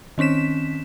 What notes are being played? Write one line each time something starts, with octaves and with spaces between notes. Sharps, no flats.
D#3 C4 C#4 B6 E7